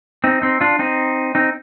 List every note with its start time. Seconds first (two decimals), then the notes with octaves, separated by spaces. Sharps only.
0.24 C4 D#4
0.42 C4 D#4
0.61 D4 F4
0.79 C4 D#4
1.35 C4 D#4